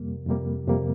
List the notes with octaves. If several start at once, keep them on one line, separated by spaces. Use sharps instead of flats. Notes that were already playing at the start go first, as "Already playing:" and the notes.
Already playing: F2 C3 G3 A#3
F2 C3 G3 A#3
F2 C3 G3 A#3